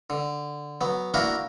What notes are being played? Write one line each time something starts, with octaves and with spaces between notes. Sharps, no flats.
D3
F#3 B3
A#3 D4 E4 F#4 A#4